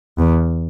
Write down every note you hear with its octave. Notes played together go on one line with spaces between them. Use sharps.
E2